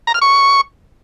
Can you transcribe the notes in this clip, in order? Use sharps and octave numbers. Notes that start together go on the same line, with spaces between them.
A#5
F6
C#6